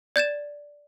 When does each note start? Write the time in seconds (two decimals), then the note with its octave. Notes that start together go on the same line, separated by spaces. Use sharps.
0.16 D5 G6 A6 E7